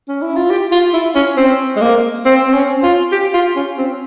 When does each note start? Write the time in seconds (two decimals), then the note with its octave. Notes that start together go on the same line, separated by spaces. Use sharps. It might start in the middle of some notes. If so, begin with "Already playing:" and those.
0.08 C#4
0.22 E4
0.36 F4
0.51 G4
0.72 F4
0.94 E4
1.15 C#4
1.37 C4
1.76 G#3
1.81 A#3
2.25 C4
2.48 C4
2.54 C#4
2.83 F4
3.12 G4
3.34 F4
3.56 C#4
3.78 C4